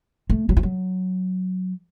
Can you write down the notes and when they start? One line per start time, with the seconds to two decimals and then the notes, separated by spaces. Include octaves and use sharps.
0.30 A3
0.49 F#3
0.57 F3
0.63 F#3